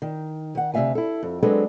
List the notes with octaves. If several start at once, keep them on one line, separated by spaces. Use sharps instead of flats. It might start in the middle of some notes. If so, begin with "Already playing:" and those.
D#3
D#3 F#5
D2 C3 C4 E5 F5 G#5
E4 A4
F2
F#3 G#3 C4 D4 A4 B4